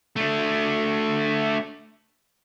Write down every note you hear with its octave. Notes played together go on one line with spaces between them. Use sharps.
A3 D4